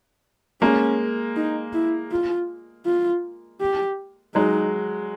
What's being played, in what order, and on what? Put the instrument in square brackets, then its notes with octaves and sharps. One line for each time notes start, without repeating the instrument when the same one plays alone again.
[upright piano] G#3 A#3 [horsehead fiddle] C#4
[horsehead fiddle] D#4
E4
F4
F4
G4
[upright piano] F#3 G#3 [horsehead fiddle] D#4